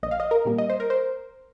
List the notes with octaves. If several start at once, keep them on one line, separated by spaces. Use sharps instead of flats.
A#1 D#5
F5
D#5
A#4
A#2 G3 A#3
D#5
C5
A#4
C5